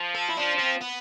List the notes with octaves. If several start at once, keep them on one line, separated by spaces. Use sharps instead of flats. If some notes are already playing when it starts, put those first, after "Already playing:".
Already playing: F3
A4
E4
F3 D4
C4
B3